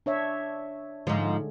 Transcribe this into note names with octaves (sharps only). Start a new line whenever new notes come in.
D4 C#5 E5
G#2 D3 F3 G#3